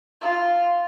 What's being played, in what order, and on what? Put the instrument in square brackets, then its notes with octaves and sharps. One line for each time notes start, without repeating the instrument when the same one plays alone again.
[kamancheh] F4